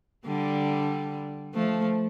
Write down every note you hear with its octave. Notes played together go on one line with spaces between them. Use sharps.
D3 G3
F3 A3